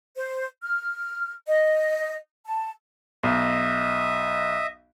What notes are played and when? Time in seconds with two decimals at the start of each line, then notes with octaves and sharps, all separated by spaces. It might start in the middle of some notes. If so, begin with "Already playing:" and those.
0.16 C5
0.62 F6
1.47 D#5
2.45 A5
3.23 B1 D#5 E5